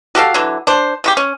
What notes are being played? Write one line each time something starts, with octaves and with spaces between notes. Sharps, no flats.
F#4 G4 A4 F5
D3 E3 F#3
D4 C5
C#3 F#4 G4
C#4